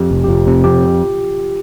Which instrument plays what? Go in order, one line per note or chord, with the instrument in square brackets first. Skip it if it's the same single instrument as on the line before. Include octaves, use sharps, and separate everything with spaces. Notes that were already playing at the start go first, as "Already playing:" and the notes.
Already playing: [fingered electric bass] F2 [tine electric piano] G4
[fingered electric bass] F1
[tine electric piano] G4
[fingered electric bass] F1 [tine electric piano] F4
[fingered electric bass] C3
[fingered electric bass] F2 [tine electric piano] G4